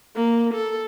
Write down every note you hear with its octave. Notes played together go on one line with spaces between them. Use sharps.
A#3
A4